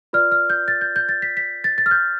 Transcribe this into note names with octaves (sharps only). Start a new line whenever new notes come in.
F4 B4 D5 F6
F6
G6
A6
G6
G6
A6
B6
B6
A6
A6
F6
G6